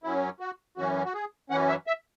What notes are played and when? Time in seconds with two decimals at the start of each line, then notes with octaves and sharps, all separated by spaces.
0.03 F#2 F#3 C#4 E4
0.40 F#4
0.77 F#2 E3 C#4 F#4
1.05 F#4
1.14 G#4
1.50 F#2 E3 C#4 F#5
1.68 E5
1.87 E5